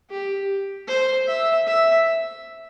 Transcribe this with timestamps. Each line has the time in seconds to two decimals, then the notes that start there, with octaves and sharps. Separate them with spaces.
0.10 G4
0.88 C5
1.27 E5
1.67 E5